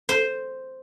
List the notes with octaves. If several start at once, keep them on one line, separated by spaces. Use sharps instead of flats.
C5